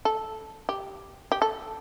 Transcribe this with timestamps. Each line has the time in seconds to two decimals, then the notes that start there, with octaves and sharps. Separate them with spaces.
0.05 A4
0.69 G4
1.32 G4
1.42 A4